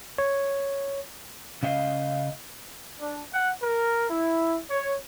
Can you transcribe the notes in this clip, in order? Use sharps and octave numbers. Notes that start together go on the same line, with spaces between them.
C#5
C#3 C#4 D#5 F5
D4
F#5
A#4
E4
C#5